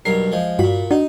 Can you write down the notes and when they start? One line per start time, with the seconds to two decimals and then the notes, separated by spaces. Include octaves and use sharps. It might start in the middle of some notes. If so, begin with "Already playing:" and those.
0.05 B1 G2 A#4 C7
0.32 F3 G#3
0.59 G2 A#2 F4 F#4 B5
0.91 D4 D#4 F#4